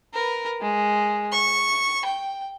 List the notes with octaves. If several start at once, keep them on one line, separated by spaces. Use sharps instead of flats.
A#4 B4
G#3
C#6
G5